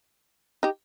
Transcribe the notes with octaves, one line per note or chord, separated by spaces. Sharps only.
D#4 G4